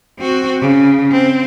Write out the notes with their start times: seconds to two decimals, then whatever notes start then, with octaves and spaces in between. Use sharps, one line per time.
0.19 C4 F#4
0.62 C#3
1.11 C4